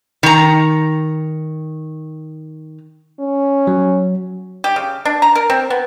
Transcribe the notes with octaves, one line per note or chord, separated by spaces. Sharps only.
D#3 A#5
C#4
F#3
G4
C#3
D4
A#5
A#4
C4
B3